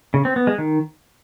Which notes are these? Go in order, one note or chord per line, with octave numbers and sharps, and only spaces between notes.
C#3
C4
B3
G#3
D#3